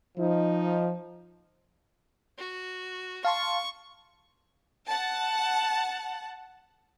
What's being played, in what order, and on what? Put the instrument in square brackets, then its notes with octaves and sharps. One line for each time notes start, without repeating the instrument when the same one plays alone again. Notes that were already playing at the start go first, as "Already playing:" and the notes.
[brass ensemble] F3 D#4
[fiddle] F#4
[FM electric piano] F5 A5 C6 [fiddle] C#6
[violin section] F#5 A5